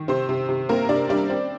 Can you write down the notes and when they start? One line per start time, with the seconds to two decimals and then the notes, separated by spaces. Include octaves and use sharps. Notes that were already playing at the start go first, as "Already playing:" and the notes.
Already playing: D#3
0.08 C3 C4 C5
0.29 C3
0.49 C3
0.69 A#3 C4 A#4
0.89 C3 D4 D5
1.09 G3 D4 D5
1.30 C4